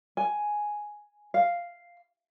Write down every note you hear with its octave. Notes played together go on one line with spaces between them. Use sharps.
G#5
F5